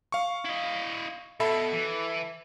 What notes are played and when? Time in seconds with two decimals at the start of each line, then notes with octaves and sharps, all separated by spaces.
0.12 F5 C#6
0.45 E4 D#5
1.40 B2 A4 E5 B5
1.73 E3